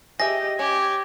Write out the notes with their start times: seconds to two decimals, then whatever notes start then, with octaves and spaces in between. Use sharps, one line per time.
0.20 G4 G#4 D#5 E5 A#6
0.59 C#4 G4 G#6